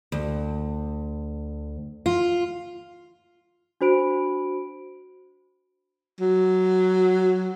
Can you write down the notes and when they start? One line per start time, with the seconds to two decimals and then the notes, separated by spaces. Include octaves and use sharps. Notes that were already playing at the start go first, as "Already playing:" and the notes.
0.12 D2
2.06 F4
3.81 D4 F#4 C5 B5 D7
6.20 F#3